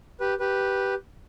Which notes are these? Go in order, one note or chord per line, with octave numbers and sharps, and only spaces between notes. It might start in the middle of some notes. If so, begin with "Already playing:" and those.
G4 B4
G4 B4